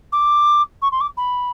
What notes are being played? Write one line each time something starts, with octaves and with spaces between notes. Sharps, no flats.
D6
C#6
C6
D6
B5